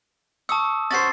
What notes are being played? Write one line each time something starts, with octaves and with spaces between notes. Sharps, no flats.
A5 C#6 D#6 E6
C#4 F#4 C5 A6 C7